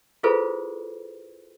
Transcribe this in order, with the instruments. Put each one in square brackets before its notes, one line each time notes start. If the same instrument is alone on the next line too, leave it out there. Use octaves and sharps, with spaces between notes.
[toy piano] E4 F4 G#4 A4 B4 C5